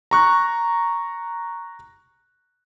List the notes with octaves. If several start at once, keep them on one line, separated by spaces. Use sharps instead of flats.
A#5 C#6 F#6